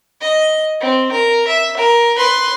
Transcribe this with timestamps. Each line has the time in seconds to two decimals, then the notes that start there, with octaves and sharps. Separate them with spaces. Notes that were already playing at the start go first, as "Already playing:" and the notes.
0.21 D#5
0.81 C4
1.11 A#4
1.47 E5
1.77 A#4
2.17 B4 C6